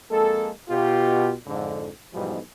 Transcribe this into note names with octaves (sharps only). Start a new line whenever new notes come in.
F2 G#3 A#3 A4
B2 F4 G4
F2 G#2 D3
B1 G#2 B2 E3 F3 G3